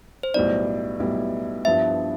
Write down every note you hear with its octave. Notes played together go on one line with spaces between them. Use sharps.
C5
B1 A2 G3 B3 E4 D5
B1 A2 G3 B3 E4
G2 F3 B3 E4 E5